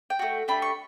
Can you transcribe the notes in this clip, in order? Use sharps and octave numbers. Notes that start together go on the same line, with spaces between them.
G5
A3 C#4 F#4
A3 D4 G4 B5
C#6